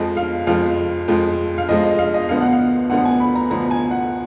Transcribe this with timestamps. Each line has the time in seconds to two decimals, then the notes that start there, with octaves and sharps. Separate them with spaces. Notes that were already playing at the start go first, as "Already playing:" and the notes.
Already playing: F2 F3 G#3 D#5
0.17 F5
0.47 F2 F3 G#3 F5
1.08 F2 F3 G#3
1.58 F5
1.69 F2 F3 G#3 D#5
1.84 D#5
1.99 F5
2.14 D#5
2.29 D2 D3 F3 B3 F5
2.41 F#5
2.53 F5
2.90 D2 D3 F3 B3 F#5
3.05 G#5
3.20 B5
3.35 A#5
3.50 D2 D3 F3 B3 A#5
3.71 G#5
3.91 F#5